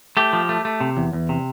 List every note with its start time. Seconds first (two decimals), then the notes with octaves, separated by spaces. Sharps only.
0.17 A3 G4
0.33 F3
0.49 A3
0.65 A3
0.81 C3
0.97 E2
1.13 E2
1.29 C3